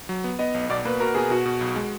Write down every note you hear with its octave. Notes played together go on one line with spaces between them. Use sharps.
F#3
B3
B3 D#5
B1
B2 D5
A#3 B4
F#4 A#4
B2 G#4
B2 F#4
B2
B1
G#3